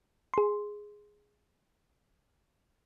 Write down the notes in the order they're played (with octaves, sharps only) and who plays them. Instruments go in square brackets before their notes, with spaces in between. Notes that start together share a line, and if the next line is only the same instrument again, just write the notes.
[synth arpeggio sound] G#4 C6